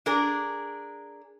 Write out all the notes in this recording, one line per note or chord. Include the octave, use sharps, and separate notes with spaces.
D4 G#4 A#4